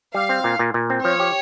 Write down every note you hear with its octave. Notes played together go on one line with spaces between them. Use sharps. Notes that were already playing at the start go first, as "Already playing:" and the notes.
G3 F5
C4
A#2
A#2
A#2
C4
F3 C#5
G4